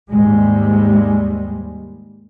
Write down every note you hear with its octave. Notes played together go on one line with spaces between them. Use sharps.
D#2 G#2 G3 G#3